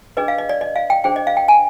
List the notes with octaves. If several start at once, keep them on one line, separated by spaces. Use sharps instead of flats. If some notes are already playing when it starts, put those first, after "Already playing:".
D4 G#4 B4 D#5
F5
D#5
D5
D#5
F5
G5
D4 G#4 C5 G5
D#5
F5
G5
G#5